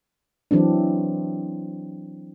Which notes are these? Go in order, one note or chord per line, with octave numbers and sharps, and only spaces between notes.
E3 F#3 C4 D4